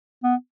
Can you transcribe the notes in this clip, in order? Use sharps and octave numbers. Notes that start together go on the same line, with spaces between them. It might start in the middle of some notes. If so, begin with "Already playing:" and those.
B3